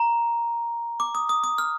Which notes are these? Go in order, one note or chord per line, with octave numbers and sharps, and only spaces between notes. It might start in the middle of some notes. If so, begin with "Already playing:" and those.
Already playing: A#5
D6
D#6
D#6
D#6
F6